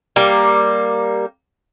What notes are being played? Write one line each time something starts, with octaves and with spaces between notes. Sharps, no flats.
G3 A#3